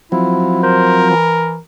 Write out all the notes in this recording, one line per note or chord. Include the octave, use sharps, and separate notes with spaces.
F3 F#3 C4 E4
A#4 C5
E3